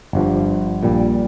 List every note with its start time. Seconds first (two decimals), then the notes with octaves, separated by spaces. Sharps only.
0.13 G1 G2 F3
0.83 A#1 A#2 G3